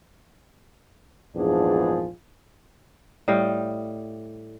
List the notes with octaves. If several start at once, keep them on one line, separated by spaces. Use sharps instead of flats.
A#1 E2 G#2 F3 D4 G#4
A2 G3 D#5 F5